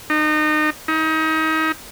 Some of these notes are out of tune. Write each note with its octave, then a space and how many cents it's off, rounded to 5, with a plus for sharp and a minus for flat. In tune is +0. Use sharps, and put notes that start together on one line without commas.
D#4 -30
D#4 +30